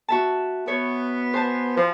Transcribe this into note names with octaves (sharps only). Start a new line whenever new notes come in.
F#4 E5 A5
B3 F#4 B4 C#5
C5 G#5 A5
F3